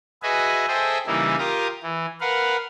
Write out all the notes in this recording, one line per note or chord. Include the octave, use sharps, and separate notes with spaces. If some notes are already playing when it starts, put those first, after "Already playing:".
F#4 G#4 B4 D#5 E5 G#5
G#4 A4 C5 D#5 E5 G5
C#3 E3 G3 A#3 D#4 E4
F4 G4 A#4 A#5 D#6
E3
A#4 B4 F5 F#5